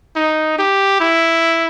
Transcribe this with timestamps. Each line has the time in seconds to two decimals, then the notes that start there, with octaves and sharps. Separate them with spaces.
0.16 D#4
0.58 G4
1.00 E4